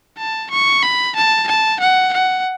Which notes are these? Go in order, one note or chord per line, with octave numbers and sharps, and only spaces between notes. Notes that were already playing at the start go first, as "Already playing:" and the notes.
A5
C#6
B5
A5
A5
F#5
F#5